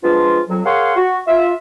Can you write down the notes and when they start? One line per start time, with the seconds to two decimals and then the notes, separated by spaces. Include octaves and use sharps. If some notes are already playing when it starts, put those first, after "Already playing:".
0.04 F3 G#3 B3 D4 F4
0.50 F2 F#3
0.66 G#4 A#4 C#5 F5 F#5 C6
0.96 F#4
1.28 F4 E5